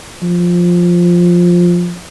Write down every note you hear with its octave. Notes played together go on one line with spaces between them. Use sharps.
F3